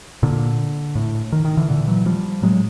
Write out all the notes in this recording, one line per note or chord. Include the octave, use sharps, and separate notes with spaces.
A#2 D3
A2
D#3
D#3
D3 E3
A#2 D3 E3
E3 F#3
F3 G3
A2 F#3 G#3